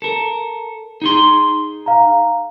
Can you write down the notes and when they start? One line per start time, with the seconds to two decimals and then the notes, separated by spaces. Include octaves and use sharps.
0.02 A4 A#4
1.02 D#4 G#4 C6
1.86 F5 A#5